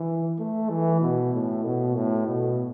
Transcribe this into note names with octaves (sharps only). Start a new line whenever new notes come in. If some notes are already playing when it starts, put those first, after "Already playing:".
Already playing: E3
A3
E3
B2
A2
B2
A2
B2